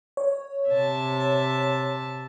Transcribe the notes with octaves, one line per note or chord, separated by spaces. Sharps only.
C#5
C3 E5 A5